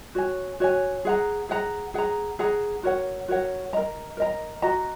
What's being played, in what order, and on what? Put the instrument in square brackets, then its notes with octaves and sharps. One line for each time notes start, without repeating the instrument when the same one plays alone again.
[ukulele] F#4 C#5 G#5
F#4 C#5 G#5
G#4 F#5 A#5
G#4 F#5 A#5
G#4 F#5 A#5
G#4 F#5 A#5
F#4 A#4 C#5 F#5
F#4 A#4 C#5 F#5
A#4 D#5 A#5
A#4 D#5 A#5
F#4 D#5 A#5